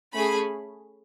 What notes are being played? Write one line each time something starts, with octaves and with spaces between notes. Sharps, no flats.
A3 C#4 G#4 B5